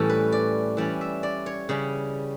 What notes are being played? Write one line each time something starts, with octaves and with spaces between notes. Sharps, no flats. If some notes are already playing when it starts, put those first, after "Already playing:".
Already playing: A2 E3 G3 C#4 A4
B4
D5
E3 G3 C#4 D5
E5
D5
C#5
C#3 G3 C#4